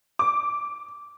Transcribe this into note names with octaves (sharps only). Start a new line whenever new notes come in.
D6